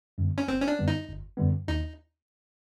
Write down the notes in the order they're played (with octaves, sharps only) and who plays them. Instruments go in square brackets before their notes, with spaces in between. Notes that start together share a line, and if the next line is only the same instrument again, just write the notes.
[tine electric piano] F#2 D3 G3 B3
[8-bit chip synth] C#4
[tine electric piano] G1 [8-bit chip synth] C4
[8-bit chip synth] C#4
D4
[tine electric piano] F#2 D3 G3 B3
[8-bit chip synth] D#4
[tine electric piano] G1
F#2 D3 G3 B3
[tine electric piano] D#2 [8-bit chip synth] D#4